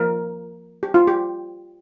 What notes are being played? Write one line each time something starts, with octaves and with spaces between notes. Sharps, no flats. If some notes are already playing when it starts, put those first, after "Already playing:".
Already playing: F3 A#3 A#4
G4
F4
G4